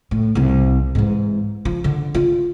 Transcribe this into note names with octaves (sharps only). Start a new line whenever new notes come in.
A2
C2 C4
G#2 E3
F3
D3
F4